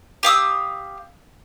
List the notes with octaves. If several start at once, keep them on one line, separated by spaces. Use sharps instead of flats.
G4 F5 D#6 E6